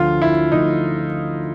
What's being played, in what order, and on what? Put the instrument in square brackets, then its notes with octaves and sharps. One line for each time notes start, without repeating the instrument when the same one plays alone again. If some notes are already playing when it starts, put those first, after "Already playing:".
Already playing: [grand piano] D2 D3 F3 A3 [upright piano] F4
[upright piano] E4
[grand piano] D2 D3 F3 A3 [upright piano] D#4